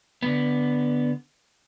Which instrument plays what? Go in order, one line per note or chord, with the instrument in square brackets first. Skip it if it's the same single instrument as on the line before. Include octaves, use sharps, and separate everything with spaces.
[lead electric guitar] D3 B3